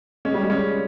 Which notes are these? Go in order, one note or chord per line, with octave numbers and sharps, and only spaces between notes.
G#3 C#4
G3
G#3
C#4